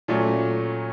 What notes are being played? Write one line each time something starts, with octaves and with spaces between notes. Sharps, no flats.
A#2 F#3 A3 C#4